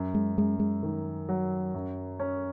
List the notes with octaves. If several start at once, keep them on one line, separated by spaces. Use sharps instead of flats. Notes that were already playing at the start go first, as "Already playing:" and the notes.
Already playing: F#2
G#3
F#2 G#3
G#3
D#3
F#3
F#2
C#4